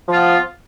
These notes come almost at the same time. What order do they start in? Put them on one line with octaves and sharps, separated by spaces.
F3 F4 B3